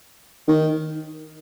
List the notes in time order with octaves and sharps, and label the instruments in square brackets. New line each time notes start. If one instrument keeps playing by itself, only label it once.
[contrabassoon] D#3